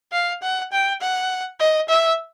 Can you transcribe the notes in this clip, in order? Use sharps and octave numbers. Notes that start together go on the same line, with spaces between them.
F5
F#5
G5
F#5
D#5
E5